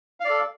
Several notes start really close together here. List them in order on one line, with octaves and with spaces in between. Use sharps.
F5 D5 A4